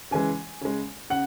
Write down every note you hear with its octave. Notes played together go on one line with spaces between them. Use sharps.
C#3 E3 G#3 G#5
C#3 G#3
C#3 F#5